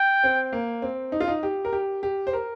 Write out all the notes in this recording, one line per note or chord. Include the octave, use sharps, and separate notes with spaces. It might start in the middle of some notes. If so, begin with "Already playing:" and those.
Already playing: G5
C4
A#3
C4
D#4
F4
D#4
G4
A#4
G4
G4
C5
A#4